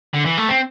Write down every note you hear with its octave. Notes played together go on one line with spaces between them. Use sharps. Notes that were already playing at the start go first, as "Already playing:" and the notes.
D3
E3
A3
C4